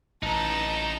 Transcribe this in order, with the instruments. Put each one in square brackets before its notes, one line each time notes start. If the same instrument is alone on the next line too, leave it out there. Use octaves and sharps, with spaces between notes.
[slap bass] A1 [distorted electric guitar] D#4 B4 [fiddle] A5 A#5